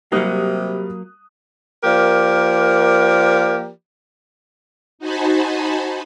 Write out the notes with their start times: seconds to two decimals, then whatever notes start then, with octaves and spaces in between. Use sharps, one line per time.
0.12 C3 F#3 G3 A#3 D#6 F#6
1.84 F3 A#3 G4 A#4 D5
4.99 D#4 F#4 C5 G#5 A5 B5